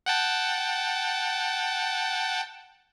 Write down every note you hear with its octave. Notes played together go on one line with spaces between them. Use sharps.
F#5 G5 A5